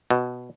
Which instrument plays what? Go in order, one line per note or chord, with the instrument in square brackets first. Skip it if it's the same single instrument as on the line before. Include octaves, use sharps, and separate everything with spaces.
[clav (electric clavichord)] B2